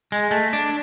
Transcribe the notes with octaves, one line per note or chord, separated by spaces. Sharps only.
G#3
A3
D4